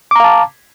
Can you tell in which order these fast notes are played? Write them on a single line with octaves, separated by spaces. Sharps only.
D6 A#5 F5 A5